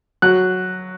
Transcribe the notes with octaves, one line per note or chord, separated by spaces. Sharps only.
F#3 F#6